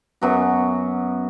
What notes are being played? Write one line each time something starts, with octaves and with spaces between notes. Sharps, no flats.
F#2 F#3 B3 F#4